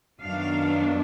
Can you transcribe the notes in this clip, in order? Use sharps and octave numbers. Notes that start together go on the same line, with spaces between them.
F#2 D#3 F#3 B3 D4 F5